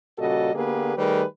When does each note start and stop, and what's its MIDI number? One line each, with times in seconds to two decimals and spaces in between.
0.19 0.53 46
0.19 0.53 49
0.19 0.53 55
0.19 0.53 66
0.19 0.53 69
0.19 0.53 75
0.55 0.95 50
0.55 0.95 58
0.55 0.95 59
0.55 0.95 67
0.55 0.95 68
0.55 0.95 71
0.97 1.23 51
0.97 1.23 55
0.97 1.23 57
0.97 1.23 68
0.97 1.23 70
0.97 1.23 71